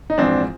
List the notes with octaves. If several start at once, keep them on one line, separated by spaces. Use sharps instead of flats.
D#4
A#1 G#2 E3 C4 D4